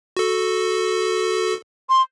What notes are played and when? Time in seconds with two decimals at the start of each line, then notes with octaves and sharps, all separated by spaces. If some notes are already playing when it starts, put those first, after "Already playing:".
0.17 F#4 A4
1.89 C6